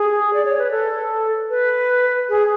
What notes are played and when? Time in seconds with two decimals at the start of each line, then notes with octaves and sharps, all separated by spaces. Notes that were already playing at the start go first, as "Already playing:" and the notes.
Already playing: G#4
0.33 D5
0.45 C#5
0.58 B4
0.71 A4
1.50 B4
2.29 G#4